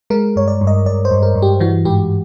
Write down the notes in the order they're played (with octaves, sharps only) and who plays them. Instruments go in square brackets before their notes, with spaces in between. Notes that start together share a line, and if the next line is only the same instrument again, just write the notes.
[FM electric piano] G#3 A#4
G2 C#5
D5
G2
D#5
G2 D5
C5
G2
A#4
G2
G4
E3 F#4
G#2 G4